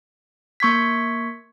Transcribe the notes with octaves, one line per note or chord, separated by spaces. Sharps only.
A#3 C#6 G#6 B6